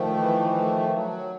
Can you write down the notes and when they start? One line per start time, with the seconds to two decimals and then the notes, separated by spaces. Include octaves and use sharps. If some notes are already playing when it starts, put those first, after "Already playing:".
Already playing: D#3 F3 A3
0.17 E3
0.54 A3
0.93 F#3